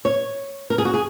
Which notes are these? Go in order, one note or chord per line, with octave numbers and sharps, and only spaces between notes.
C#5
A#4
G#4
F#4
G#4